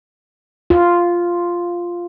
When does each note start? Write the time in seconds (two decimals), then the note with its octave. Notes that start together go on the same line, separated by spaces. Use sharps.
0.70 F4